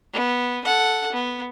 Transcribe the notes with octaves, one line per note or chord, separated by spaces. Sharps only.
B3
A4 F#5
B3